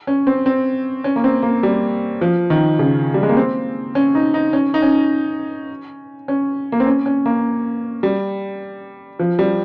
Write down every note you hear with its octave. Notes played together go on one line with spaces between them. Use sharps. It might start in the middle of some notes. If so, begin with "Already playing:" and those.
C#4
C4
C4
C#4
A#3
C4
A#3
G3
F3
D#3
C#3
G3
G#3
A#3
C4
C#4
D#4
D#4
C#4
D#4
C#4
C#4
A#3
C4
C#4
C#4
A#3
G3
F3
G3